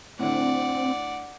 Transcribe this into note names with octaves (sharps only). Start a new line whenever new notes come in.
A2 D3 C4 D5 F#5